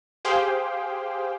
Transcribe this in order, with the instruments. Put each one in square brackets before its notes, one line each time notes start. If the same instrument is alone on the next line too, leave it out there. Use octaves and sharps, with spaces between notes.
[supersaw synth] G4 G#4 C5 F5 G5